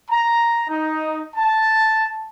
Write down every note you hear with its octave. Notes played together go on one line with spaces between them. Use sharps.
A#5
D#4
A5